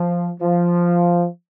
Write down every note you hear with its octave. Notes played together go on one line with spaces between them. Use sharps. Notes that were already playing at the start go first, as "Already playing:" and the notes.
Already playing: F3
F3